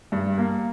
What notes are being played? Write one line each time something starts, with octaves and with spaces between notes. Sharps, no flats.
G2
A#3